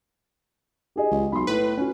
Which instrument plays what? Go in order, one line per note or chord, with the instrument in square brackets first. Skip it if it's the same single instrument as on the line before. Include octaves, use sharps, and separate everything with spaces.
[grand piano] G4 G#4 D#5
[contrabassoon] C#2
[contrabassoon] B1 [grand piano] B5 C6
[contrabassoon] A2 [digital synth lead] B4
[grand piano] C#4 F#4